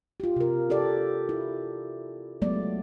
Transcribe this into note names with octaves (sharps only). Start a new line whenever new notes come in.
F4 G4
C3 A#4
G4 A4 D5
E4
F#3 G#3 A3 B3 D5